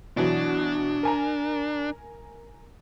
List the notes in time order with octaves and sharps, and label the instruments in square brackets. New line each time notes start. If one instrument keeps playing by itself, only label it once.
[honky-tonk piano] B2 E3 F#3 [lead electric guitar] D4
[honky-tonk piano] A#4 G#5 A#5